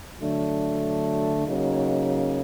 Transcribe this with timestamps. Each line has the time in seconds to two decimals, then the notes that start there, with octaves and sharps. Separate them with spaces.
0.19 D3 F#3 A3 D4
1.45 C#3 F#3 A#3 D#4